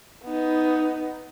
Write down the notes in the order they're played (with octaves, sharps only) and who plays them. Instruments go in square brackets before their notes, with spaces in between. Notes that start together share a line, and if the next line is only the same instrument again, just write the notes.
[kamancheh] B3 D#4